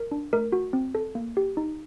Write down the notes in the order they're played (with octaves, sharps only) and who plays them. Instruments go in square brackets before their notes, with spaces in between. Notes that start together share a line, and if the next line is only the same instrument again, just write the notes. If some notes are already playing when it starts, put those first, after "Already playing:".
Already playing: [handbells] A#4
D4
A3 A#4
F#4
C4
A4
A#3
G4
D#4